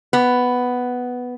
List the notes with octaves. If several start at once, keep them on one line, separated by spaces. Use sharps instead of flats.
B3